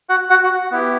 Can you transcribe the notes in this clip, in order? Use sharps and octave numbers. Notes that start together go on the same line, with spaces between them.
F#4 F#5
F#4 F#5
F#4 F#5
B3 E4 G4